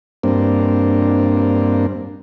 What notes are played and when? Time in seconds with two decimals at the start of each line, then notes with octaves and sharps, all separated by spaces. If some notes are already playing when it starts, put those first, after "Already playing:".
0.23 G2 A#3 C4 D4